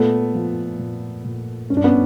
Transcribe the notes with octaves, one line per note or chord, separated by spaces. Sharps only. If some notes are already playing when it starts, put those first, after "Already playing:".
Already playing: A#2 A3 B3
F3
A#2
A#2
G2 C#4
D4
B3 C#4